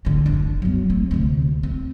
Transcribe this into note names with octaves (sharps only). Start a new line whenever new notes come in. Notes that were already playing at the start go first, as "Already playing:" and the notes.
A1 D3
F#1 D4
F#3 B3
A3 C4
D2 C3
C4